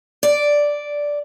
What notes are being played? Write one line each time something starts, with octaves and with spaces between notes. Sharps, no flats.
D5